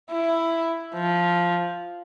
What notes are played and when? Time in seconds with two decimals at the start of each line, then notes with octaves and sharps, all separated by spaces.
0.10 E4
0.94 F3